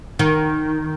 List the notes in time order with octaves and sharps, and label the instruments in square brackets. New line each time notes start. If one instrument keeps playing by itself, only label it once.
[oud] D#3